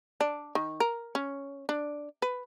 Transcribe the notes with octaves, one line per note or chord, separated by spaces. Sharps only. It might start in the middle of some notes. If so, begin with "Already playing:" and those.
D4
D#3
A#4
C#4
D4
B4